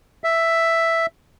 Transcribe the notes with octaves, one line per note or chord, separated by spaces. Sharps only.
E5